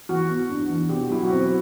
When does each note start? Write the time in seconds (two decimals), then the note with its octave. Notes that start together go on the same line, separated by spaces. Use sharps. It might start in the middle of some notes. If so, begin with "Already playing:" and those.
0.09 E3 F#4
0.30 B3
0.50 D4
0.70 E3
0.89 B2 G4
1.01 F#4
1.10 F#3 E4
1.24 F#4
1.30 C4